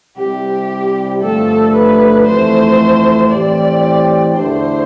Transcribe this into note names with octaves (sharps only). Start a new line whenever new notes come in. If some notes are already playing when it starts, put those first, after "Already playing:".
C2 C3 G3 G4
G2 D3 F3 A3 A4
B4
F2 E3 A3 C5
A2 E3 G3 C4 G4 D5
E2 D3 A3 D4 C5